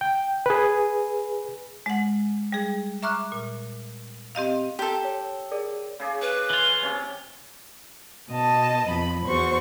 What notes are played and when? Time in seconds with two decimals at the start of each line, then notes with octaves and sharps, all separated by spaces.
0.01 G5
0.46 G#4 B4
1.86 G#3 F#5
2.52 G3 G#4
3.03 E5 A#5 C#6 D6 F6 F#6
3.32 A#2
4.35 C4 G4 D#5 F5
4.79 G4 A4 G5 A#5 C6
5.04 C#5
5.51 G#4 A#4 D5
6.00 C#3 G#4 D5
6.22 B4
6.50 E3 F4
6.83 C3 C#4
8.30 B2 D#5 A5
8.88 F2 B5
9.27 E2 F#4 C5 C#6